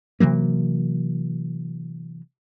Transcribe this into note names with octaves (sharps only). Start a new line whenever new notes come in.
C3 E3 F#3 A#3